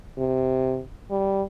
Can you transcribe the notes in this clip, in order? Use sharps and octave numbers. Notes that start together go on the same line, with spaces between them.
C3
G3